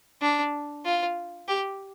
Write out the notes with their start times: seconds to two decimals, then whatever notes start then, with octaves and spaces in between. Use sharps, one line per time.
0.22 D4
0.85 F4
1.48 G4